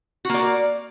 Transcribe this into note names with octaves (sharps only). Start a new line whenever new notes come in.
A#3 F#4 D5